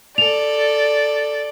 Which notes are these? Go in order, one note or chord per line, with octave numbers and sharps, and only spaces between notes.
A4 D5 F7